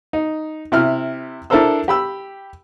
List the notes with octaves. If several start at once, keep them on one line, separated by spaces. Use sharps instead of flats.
D#4
C3 E4 F6
D4 E4 A4 A#4 C5 E6
G4 B5 E6